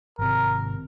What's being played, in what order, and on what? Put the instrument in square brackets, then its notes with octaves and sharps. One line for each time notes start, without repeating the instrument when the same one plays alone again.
[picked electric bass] G#1 C3 [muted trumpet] A#4